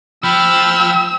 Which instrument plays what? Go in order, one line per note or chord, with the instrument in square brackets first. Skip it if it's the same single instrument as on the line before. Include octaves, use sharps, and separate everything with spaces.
[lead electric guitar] F3 [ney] G5 [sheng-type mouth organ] B5 F6 G6 [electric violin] E6